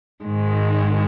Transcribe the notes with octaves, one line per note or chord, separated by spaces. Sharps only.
G#2 D#3 G#3